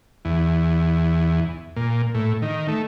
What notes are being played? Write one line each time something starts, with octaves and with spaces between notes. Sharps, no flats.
E2
A#2
A2
D#3
A3